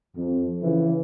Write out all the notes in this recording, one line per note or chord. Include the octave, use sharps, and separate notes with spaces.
F2
C#3 E3 E4